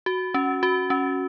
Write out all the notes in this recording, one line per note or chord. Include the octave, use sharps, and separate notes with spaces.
F#4
C#4
F#4
C#4